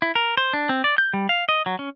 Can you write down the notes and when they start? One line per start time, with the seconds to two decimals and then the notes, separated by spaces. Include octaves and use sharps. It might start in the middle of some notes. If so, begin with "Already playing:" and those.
0.02 E4
0.15 A#4
0.37 C5
0.53 D4
0.69 C4
0.84 D5
0.98 G6
1.14 G3
1.29 F5
1.49 D#5
1.66 F#3
1.79 C#4